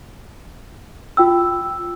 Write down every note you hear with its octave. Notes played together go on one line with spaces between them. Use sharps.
F4 G5 E6